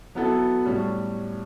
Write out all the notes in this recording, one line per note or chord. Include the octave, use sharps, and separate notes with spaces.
F#3 B3 E4 A4
A2 G3 C#4